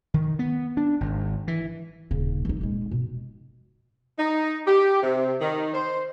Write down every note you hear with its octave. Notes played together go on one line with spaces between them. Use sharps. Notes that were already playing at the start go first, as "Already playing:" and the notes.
D#3
B3
D4
G#1
E3
D#1 C#3
E3 D#4
D#1 G#3
B2
D#4
G4
C3
D#3
C5